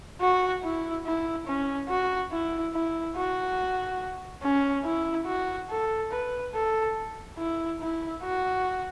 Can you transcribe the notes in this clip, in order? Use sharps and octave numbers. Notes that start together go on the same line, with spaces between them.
F#4
E4
E4
C#4
F#4
E4
E4
F#4
C#4
E4
F#4
A4
B4
A4
E4
E4
F#4